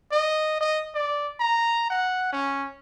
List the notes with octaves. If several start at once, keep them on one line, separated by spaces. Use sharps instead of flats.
D#5
D#5
D5
A#5
F#5
C#4